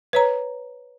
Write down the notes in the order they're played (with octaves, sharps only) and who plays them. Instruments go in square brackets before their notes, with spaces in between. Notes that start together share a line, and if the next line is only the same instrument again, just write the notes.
[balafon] B4 C#5 A#5